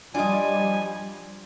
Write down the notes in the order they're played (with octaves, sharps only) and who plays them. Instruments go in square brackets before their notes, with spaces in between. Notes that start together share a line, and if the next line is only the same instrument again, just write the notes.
[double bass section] F3 G3 [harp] D4 F4 [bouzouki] D5 D#5 [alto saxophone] G#5